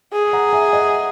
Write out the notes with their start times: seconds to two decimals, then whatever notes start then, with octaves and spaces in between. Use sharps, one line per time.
0.13 G#4
0.33 F#5 A#5
0.53 E5 G#5
0.73 D#5 F#5